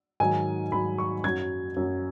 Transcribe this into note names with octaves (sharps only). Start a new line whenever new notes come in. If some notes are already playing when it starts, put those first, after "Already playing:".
G#2 D#3 F#3 G#5
G#2 D#3 F#3 B5
C#6
F#2 F#3 G#6
F#2 F#3